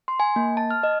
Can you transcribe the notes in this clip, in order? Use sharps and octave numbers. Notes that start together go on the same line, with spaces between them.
C6
G#5
A#3
A5
F6
D#5